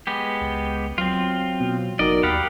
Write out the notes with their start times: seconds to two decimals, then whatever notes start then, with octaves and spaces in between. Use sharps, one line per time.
0.07 G#3 B3 G4
0.41 C#2
0.98 F#3 C4 F4
1.60 B2
1.99 F#1 D#4 F#4 A#4 D5 D#5
2.23 D#2 G4 F5 F#5 B5